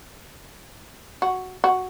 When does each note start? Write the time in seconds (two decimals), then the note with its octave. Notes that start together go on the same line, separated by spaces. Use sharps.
1.22 F#4
1.64 F#4